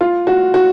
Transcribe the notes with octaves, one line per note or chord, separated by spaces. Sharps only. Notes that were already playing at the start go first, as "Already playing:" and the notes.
F4
F#4
F#4